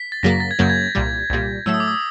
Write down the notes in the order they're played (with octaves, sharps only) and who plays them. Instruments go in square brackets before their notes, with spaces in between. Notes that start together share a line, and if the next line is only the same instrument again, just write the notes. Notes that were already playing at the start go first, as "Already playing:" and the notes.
Already playing: [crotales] B6
A6
[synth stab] F#2 C#3 F#3 A#3 [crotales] A#6
[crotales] A6
G#6
[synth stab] F#2 C#3 F#3 A#3 [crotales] G6
[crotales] G#6
[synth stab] C2 A#2 G3
C2 A#2 G3
[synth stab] A2 F#3 A3 [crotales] E6
[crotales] D#6
D6
D#6